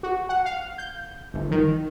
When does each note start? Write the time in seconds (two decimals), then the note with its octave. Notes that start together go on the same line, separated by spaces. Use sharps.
0.03 F#4
0.29 F#5
0.45 F5
0.78 G6
1.34 G1
1.51 D#3